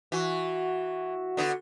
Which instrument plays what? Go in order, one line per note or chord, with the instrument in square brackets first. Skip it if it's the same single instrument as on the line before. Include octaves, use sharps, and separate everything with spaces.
[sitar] E3 [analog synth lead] F#4
[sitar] D3 B3